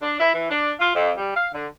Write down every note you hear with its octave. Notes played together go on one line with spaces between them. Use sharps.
D4
E4
E3
D4
F4
F2
G3
F5
D3